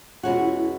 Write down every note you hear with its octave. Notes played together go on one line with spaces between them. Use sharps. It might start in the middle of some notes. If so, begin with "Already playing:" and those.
E2 B2 G#3 C#4 F4 F#4
E4
E4